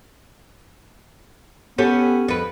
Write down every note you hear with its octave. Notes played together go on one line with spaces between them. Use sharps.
B3 C#4 G4 A4
F2 B4